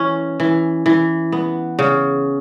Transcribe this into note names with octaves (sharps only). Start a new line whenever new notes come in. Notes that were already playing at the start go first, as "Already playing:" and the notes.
Already playing: E3 C#4
E3
E3
B3
C#3